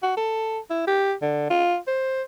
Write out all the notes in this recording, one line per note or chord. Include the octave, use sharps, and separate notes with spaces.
F#4
A4
E4
G4
D3
F4
C5